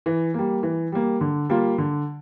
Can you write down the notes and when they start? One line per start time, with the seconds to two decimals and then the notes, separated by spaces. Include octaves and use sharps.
0.06 E3
0.34 G3 A#3
0.63 E3
0.92 G3 A#3
1.21 D3
1.49 G3 A#3 F4
1.78 D3